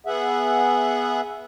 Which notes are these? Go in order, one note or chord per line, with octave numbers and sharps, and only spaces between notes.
B3 G#4 E5 F#5